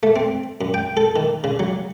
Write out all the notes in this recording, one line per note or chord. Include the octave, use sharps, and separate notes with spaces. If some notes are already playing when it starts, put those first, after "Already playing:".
A3
C4
F#2
G5
A4
D#3
C#3
F#3